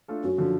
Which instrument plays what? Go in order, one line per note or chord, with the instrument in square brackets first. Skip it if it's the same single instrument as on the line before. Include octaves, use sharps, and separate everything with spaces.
[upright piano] A3 D4 F4 A4
[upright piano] F#2 [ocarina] F#4
[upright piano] D3 F3